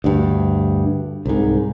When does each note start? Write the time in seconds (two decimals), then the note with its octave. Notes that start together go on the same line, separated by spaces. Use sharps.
0.04 D2 G2
1.26 C2 G#2